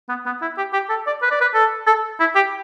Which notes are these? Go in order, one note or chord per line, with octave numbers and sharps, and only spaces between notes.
B3
B3
E4
G4
G4
A4
D5
B4
D5
B4
A4
A4
E4
G4